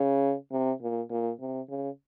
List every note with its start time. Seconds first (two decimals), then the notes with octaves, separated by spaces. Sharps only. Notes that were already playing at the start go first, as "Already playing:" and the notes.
Already playing: C#3
0.51 C3
0.81 A#2
1.10 A#2
1.40 C3
1.69 C#3